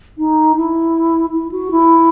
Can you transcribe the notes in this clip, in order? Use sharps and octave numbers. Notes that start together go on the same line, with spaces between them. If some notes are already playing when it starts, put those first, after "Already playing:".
D#4
E4
E4
F#4
E4